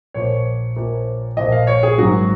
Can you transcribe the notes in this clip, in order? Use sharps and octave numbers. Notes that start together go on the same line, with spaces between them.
A#1 A#2 F3 C#5
A#1 A#2 F3
A#1 A#2 F3 D#5
F5
C#5
G#4
G#1 G#2 D#3 F#3 F#4